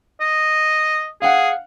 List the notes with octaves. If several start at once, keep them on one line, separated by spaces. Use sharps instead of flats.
D#5
G#4 F5 F#5